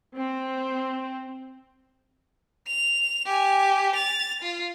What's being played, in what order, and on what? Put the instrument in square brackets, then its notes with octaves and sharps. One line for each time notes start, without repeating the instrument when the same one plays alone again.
[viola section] C4
[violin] F7
G4 G#5
A6 F7
F4